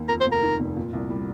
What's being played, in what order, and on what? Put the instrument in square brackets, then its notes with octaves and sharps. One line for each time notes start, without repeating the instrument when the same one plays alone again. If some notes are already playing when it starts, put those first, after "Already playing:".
Already playing: [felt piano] D#2
[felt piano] F2 [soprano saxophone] A#4
[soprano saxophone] C5
[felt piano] F1
[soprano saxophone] A#4
[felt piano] D#3
F1
A#2
C2
G3